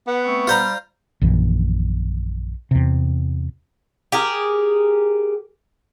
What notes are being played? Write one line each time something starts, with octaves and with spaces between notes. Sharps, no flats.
B3 F#5
A3 C4 C#6
G3 F4 C5 A#5
A#1 F#2 D#3 E3
E2 C3
G4 G#4 A#4